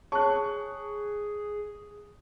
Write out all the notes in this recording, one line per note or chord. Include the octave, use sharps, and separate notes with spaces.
G#4 C#5 A5 C#6 F#6